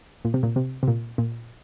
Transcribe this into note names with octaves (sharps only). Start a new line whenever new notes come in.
A#2
C3
A#2
C3
C3
A#2
A#2